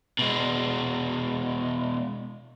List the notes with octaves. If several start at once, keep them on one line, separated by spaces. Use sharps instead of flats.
B2 G#3